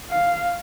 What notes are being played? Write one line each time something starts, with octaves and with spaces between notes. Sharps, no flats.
F5